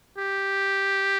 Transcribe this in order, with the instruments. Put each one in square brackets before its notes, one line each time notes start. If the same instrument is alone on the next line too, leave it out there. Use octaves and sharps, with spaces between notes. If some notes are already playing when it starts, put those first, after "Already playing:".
[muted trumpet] G4